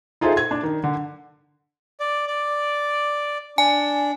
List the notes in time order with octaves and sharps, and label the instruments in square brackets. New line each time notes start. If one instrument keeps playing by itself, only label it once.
[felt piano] D#4 F4 G#4 A4 C5 E5
G#6
D4
D#3
D3
[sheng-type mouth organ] D5
D5
[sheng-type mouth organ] D4 [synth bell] G#5